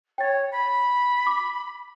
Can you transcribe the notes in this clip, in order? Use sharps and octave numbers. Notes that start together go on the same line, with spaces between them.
C#5 G5 A6
B5
D6